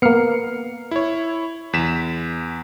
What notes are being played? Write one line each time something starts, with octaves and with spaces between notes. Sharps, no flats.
A#3 B3 F6 C7 C#7
E4 C#5
E2 B6 E7